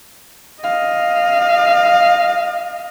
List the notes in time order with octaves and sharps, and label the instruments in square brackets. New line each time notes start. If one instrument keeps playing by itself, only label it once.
[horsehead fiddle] D#5 F5